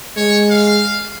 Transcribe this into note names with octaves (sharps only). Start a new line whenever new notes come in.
G#3 C#5
F5